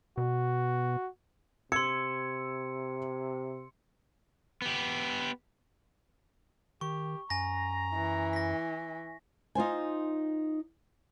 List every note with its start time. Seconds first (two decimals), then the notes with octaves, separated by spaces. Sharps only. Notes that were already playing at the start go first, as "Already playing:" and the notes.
0.18 B2 F#4
1.72 C3 C6 E6 G#6 C#7
4.62 B3 G4
6.81 D#3 G4 C#6
7.30 F#2 G#5 A#5 A#6
7.95 E3
8.33 A#6 B6
9.55 D#4 F4 C5 G#5